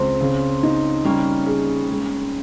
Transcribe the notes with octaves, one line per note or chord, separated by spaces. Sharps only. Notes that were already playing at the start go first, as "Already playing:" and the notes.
Already playing: C#2 C4
C#3
D#4
G3 A#3 C#4
G#4
G#3